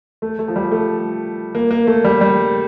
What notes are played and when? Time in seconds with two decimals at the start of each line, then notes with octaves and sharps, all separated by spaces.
0.22 A3
0.39 A3
0.48 F3
0.56 G3
0.72 A3
1.55 A#3
1.71 A#3
1.87 A3
2.04 G3
2.21 G3